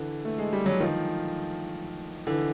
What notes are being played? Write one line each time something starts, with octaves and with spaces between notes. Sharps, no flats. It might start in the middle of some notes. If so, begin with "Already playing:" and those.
Already playing: D3 E3
A3
G#3
G3
F#3
D#3 F3
D3 E3